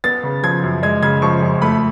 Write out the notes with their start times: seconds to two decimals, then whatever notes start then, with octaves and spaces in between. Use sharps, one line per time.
0.04 B3 A6
0.23 C#3
0.43 F3 G#6
0.63 F#2
0.83 G#3 G#6
1.02 C#3 G#6
1.22 F3 C#6
1.42 F2
1.62 A3 B5